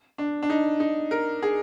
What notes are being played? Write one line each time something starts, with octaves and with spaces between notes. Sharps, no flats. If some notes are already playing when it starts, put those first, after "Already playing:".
D4
D4
D#4
D#4
A#4
G#4